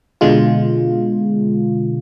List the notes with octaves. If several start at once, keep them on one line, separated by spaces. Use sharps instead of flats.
B2 D3 G#3 F4